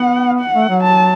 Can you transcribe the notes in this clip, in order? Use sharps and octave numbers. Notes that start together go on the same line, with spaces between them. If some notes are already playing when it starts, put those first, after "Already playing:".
Already playing: B3 F#5
F#5
A3
F#3
A5